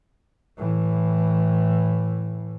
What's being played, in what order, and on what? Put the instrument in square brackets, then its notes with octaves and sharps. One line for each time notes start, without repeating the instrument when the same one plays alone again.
[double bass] A2 E3